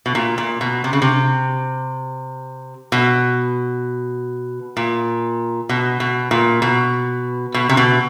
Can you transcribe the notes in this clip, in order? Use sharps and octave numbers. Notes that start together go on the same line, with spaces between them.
B2
A#2
A#2
B2
C3
C#3
C3
B2
A#2
B2
B2
A#2
B2
B2
C3
B2